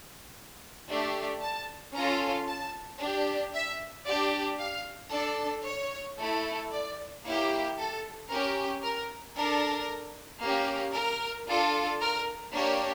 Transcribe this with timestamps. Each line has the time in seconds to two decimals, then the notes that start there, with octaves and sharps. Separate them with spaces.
0.89 A3 D4 G4
1.42 A5
1.95 C#4 F4 A4 A#5
2.48 A5
3.00 D4 G4
3.54 E5
4.06 D4 G4 D5
4.60 F5
5.12 D4 A4 D5
5.66 C#5
6.19 A3 E4 A4
6.72 D5
7.24 A#3 E4 G4 C#5
7.78 A4
8.30 C#4 G4 A#4
8.83 A#4
9.36 D4 A4 A#4
10.43 A#3 C#4 G4
10.95 A#4
11.48 D4 F4 A4
12.01 A#4
12.53 A#3 D4 G4 C#5